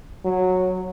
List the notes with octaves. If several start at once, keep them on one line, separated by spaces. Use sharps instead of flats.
F#3